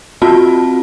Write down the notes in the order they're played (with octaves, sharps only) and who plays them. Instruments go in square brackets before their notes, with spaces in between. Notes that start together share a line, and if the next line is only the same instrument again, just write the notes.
[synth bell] C4 F4 F#4 A5